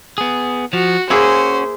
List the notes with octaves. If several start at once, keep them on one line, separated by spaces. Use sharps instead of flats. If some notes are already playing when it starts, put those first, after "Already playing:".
B3 G#4
F3 F#4
A#3 C#4 E4 F#4 G#4 C5